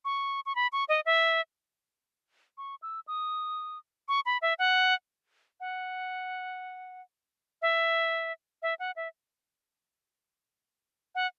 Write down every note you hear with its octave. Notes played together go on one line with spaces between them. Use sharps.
C#6
C#6
B5
C#6
D#5
E5
C#6
E6
D#6
C#6
B5
E5
F#5
F#5
E5
E5
F#5
E5
F#5